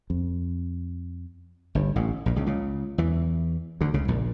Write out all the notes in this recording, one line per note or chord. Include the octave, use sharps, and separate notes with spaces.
F2
G1 G2
A1 A2
A#1 A#2
C#2 C#3
C#2 C#3
E2 E3
D2 D3
C#2 C#3
A#1 A#2